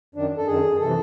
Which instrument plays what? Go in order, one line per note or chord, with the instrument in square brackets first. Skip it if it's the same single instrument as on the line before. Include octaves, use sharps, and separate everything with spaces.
[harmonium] F#2 D#3 D4
A4
F#2 D#3 G#4
C3 E3 A4